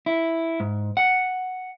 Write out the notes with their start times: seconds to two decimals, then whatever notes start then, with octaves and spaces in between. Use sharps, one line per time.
0.06 E4
0.60 G#2
0.97 F#5